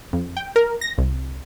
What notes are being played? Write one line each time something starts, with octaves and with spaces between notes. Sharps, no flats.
F2
G5
A#4
A#6
C2